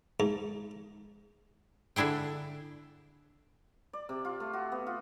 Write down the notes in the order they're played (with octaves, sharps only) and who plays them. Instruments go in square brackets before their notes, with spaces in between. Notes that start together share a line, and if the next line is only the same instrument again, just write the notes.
[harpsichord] G#2
[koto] D3 D4 E4 G#4 G5
[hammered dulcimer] D5
C3
F4
A3
F#4
B3
F4